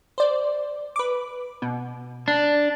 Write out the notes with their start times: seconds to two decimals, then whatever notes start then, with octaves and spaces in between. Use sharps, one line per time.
0.18 C5 D5
0.96 B4 D6
1.62 B2
2.28 D4